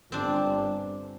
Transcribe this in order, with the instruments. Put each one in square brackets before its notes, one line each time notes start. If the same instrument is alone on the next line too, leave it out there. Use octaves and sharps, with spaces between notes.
[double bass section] G1 [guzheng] C4 D4